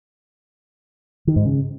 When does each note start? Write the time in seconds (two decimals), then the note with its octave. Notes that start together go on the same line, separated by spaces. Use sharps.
1.27 D#3
1.36 G#2
1.45 C#3